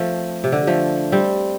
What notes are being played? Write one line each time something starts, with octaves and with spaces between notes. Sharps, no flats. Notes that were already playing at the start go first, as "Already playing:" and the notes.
Already playing: F3 A3 C4
C3
D3
F3 A3
G3 C4